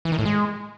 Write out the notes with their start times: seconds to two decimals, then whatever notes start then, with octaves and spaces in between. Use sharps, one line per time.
0.05 E3
0.12 D#3
0.19 A2
0.25 G#3